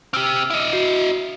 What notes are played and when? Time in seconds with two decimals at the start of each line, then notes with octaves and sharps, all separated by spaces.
0.14 C4 G4 E6 F6
0.50 E4 D#5
0.73 F#4